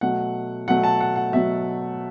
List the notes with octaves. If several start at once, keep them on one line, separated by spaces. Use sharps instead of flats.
B2 F#3 A3 F#5
B2 F#3 A3 F#5
A5
F#5
F#5
B2 F#3 A3 E5